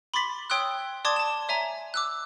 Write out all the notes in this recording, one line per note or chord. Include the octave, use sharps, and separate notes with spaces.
B5 C6 D6 A6 B6 F#7
C#5 G5 C6 D#6 E6 F#6
D5 A5 C6 D6 D#6 G#6
A5 E7
C#5 E5 G#5 A#5
D6 E6 F#6